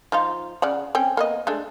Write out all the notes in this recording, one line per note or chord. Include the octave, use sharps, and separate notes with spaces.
F3 D#4 F4
C#3 D5 F#5
C4 C#4 G5
A#3 B3 D#5
G#3 A3 D4